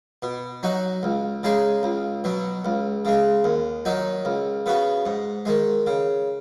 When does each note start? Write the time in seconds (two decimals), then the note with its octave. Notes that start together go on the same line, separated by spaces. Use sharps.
0.22 B2
0.63 F#3 D#4 F#4
1.03 C#2
1.43 C#3 G#3 D#4 G#4
1.83 C#2
2.24 B2 F#3
2.65 C#2
3.05 C#3 G#3
3.44 D#2
3.85 D#3 F#3 D#4
4.25 C#2
4.66 C#3 B3 F#4
5.06 G#2
5.45 D#3 G#3
5.86 C#3